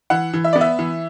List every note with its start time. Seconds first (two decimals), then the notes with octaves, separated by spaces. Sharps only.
0.10 E3 F#5
0.33 E3
0.44 E5
0.53 B3 D5
0.61 E5
0.79 E3